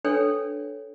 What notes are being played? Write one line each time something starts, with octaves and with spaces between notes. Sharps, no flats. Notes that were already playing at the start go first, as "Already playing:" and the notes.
D4 A4 B4 C#5 G5